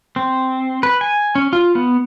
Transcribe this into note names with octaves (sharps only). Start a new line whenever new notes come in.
C4
B4
G#5
C#4
F4
B3